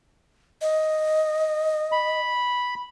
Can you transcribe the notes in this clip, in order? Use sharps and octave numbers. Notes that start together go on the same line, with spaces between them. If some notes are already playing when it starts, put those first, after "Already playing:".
D#5
B5